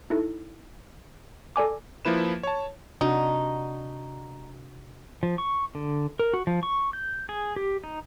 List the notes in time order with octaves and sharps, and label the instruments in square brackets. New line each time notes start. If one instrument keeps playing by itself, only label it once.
[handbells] D#4 E4 A4
A4 D5 G#5 D6
[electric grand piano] F3 A#3 E4 B4 E7
C#5 A5
[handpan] C3 D4 F#4 [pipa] D#4
[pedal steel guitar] F3
C#6
D3
A#4
F#4
F3
C#6
G6
G#4
G4
D#4